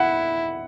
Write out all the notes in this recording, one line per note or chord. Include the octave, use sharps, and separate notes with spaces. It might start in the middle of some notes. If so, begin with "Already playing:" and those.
Already playing: E4 F#5